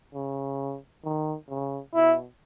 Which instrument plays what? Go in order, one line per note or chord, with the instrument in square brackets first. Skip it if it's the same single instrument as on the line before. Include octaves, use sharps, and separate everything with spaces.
[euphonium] C#3
D#3
C#3
[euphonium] B2 [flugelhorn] E4